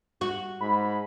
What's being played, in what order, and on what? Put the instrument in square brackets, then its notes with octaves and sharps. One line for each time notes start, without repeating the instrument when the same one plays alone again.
[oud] F#4
[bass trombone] G#2 [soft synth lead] B5